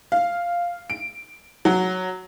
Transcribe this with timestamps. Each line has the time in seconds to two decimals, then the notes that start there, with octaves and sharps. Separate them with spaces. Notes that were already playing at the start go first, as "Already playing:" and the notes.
0.12 F5
0.90 D7
1.65 F#3